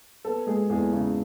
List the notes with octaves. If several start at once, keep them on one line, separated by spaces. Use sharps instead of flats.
B3 A4
G#3 G#4
E2 G#4
C#3